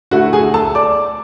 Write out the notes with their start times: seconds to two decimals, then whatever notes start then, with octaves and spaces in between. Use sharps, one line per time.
0.11 D3 A3 E4 F#4 F#5
0.33 G#4 G#5
0.54 A4 A5
0.75 D5 D6